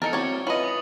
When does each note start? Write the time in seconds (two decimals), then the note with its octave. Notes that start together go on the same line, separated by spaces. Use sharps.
0.02 E2 D#4 A4 A#4 A6 C#7
0.13 G3 C4 E4 F#4 C#5
0.47 C#4 E4 F4 B4 D#5 F#7
0.64 D#6